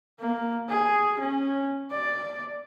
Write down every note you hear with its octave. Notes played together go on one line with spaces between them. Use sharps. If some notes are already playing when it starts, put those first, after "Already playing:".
A#3
G#4
C#4
D5